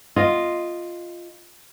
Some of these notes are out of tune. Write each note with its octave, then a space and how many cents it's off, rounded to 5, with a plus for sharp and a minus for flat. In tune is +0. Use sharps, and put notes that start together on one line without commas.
F4 +0 D#5 +0